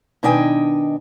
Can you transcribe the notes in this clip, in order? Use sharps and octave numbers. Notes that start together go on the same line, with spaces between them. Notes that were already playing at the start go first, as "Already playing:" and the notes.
B2 D#3 D4 D#5 G5 G#5